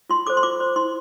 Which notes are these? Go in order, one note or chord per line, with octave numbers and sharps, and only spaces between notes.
F4 C6
A4 C5 D6
C6
F4 D6
C5
E4 C6